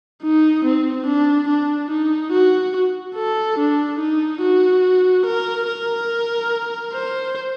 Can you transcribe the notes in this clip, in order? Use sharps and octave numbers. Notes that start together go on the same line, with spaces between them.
D#4
C4
D4
D4
D#4
F#4
A4
D4
D#4
F#4
A#4
A#4
C5